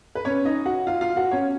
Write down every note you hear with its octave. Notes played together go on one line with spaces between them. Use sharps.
B4
C#4 C#5
D#4 D#5
F#4 F#5
F4 F5
F4 F5
F#4 F#5
C#4 C#5